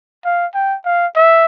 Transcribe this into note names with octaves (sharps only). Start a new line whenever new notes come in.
F5
G5
F5
E5